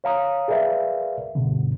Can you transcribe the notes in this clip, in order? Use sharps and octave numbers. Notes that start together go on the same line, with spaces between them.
C#5 F5 A#5 D#6
G#4 A#4 B4 D5 E5 F5
C#2 G2 B2 D3